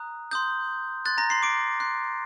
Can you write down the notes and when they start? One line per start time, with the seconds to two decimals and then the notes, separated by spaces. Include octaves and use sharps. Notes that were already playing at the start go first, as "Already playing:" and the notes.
Already playing: A#5 D#6 F#6
0.31 C6 D#6 G6
1.05 C6 F#6 A6
1.18 A#5 A#6
1.30 C6 C7
1.43 D6 D7
1.80 C6 F#6